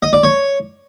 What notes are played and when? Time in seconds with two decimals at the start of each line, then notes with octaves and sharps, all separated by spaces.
0.03 D#5
0.13 D5
0.23 C#5